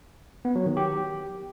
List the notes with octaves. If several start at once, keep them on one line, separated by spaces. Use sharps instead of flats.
B3
F#3
D#3
G4